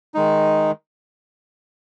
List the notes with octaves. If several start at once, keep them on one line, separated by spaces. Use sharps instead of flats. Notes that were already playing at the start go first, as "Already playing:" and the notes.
D#3 G#3 D#4